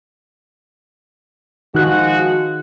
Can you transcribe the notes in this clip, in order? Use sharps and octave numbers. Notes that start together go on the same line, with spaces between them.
D#3 F3 G#3 F#4 F#6